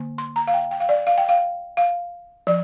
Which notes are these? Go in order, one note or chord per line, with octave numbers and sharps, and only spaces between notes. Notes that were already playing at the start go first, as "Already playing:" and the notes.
Already playing: D3 A#3
C6
A#5
F5
G5
G5
F5
D5
F5
G5
F5
F5
F3 D5